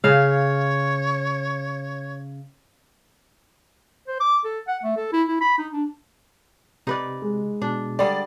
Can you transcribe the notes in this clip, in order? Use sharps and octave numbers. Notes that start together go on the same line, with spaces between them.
C#3 C#5 F5
C5
D6
A4
F#5
A3
A4
E4
E4
B5
D#4
D4
C3 D#4 B4 D5
G#3
B2 D4
D3 G3 G#4 D5